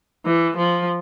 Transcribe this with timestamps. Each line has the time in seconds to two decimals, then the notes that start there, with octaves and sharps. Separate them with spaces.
0.26 E3
0.57 F3